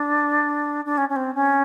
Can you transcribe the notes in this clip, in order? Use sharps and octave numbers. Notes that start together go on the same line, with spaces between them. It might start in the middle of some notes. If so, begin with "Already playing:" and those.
Already playing: D4
D4
C#4
C#4
C4
C#4